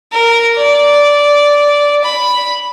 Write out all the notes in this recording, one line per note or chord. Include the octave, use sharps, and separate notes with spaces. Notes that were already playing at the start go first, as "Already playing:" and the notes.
A#4
D5
B5